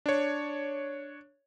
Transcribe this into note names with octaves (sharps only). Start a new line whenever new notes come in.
D4 C#5